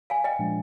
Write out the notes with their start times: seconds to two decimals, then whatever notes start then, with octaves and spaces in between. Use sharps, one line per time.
0.10 F5 G#5
0.24 D#5 G5
0.39 A#2 F3 G#3 D4